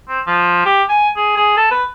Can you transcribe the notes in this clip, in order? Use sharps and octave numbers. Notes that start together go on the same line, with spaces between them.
C4
F3
G4
G#5
G#4
G#4
A4
B4